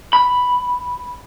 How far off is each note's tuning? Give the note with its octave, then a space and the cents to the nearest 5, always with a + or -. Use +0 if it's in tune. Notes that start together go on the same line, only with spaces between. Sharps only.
B5 +0